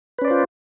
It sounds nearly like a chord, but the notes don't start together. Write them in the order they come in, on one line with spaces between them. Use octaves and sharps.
B4 C#4 D5 C5 F4